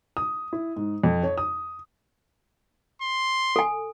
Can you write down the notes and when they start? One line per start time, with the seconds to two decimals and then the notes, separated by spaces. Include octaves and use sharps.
0.17 D#6
0.53 E4
0.76 G#2
1.04 F2
1.23 C#5
1.38 D#6
3.02 C6
3.56 A4 G#5